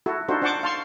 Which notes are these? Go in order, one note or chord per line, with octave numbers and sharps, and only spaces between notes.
E4 F#4 A4
D4 D#4 F4 F#4 A4 C5
D4 C5 F#5 A5 C#6 D6
F5 A5 C6 C#6